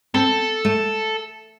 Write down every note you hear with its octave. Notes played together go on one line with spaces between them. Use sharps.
C4 A4
A3